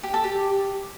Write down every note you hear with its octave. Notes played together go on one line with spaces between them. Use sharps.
G4
A4
G4